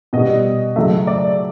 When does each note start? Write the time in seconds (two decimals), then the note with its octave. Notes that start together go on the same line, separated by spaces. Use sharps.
0.13 B2 G3 D#5
0.76 C#3 F#3 A3 E5
1.07 D5